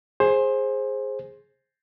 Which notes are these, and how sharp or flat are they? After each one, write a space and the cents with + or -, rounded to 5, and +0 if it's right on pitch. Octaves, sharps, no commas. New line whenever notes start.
G#4 +0 C5 +20